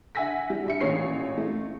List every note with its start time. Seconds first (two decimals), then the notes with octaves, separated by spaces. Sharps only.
0.15 E5 F#5 G#5 E6 A#6 B6
0.50 G3
0.66 G2 E5 C#7
0.80 A1 A#2 C#5 C7
1.38 A3